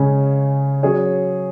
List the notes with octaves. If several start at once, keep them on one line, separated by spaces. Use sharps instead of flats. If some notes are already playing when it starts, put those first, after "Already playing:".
Already playing: C#3 G#3 C#4
F#3 C#4 G#4 C#5